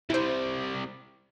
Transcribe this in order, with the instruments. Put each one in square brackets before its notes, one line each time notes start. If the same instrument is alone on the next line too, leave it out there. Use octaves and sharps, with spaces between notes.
[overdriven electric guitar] C3 G3 [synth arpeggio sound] E4 C5